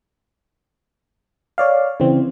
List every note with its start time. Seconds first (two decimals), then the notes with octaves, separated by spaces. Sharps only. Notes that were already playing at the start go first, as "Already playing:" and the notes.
1.58 C#5 D5 F5
2.00 C#3 E3 C4